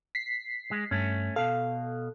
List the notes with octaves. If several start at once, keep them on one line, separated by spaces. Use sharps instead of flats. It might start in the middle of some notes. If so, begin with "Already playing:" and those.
B6 C7
G#3
G2 A3 C#4
B2 A4 F5